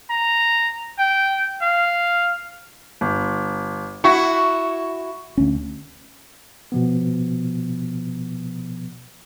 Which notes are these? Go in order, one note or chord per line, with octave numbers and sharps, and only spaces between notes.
A#5
G5
F5
G1
E4 F#4 C#6
D2 C#4
B2 F3 B3